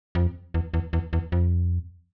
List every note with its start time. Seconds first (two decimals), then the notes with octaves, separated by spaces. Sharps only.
0.15 F2
0.54 E2
0.74 E2
0.93 E2
1.13 E2
1.32 F2